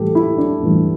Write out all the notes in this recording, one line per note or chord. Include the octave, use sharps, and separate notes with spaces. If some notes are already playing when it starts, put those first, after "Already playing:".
Already playing: A2 E3 G3 G4 A4
E4
D4
A2 E3 G3